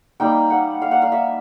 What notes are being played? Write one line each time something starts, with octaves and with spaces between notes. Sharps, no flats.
G3 A#3 D#4 G5
F#5
F5
F#5
F5
E5